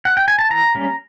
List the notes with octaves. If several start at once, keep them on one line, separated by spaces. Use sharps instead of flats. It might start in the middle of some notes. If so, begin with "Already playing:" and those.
F#5
G5
G#5
A5
E3 A#5
G3 A#3 C#4